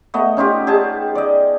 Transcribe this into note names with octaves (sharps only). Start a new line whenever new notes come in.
A3 B3 D#5
C#4 D#4 F4 G4
G4 G#4 D#5 A5
D5 D#5